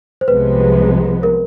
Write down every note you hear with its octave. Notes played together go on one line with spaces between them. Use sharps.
C5
C2 C3 F3 G#3 B3 B4
A#4